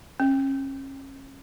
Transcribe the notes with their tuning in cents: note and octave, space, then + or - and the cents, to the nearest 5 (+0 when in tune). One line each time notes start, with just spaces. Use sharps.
C#4 -35